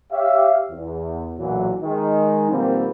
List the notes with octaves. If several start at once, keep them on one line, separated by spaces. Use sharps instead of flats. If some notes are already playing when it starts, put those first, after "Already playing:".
G4 C#5 E5 F5
E2
B1 A#2 E3 F#3
D#3 G#3 D#4
B2 D#3 F3 G3 A#3 C4